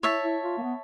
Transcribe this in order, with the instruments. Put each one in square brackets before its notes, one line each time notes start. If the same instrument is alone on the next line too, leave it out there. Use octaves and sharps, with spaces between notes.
[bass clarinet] E4 [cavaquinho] C#5 E5 A5
[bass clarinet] E4
F4
A#3
B3